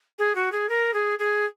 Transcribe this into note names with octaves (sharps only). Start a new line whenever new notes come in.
G#4
F#4
G#4
A#4
G#4
G#4